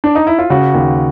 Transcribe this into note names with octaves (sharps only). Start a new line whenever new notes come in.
D4
D#4
E4
F4
C#3 F#4
D#2